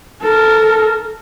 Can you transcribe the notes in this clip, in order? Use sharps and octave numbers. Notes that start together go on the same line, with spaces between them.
A4 A#4